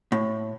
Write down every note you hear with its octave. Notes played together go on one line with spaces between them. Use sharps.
A2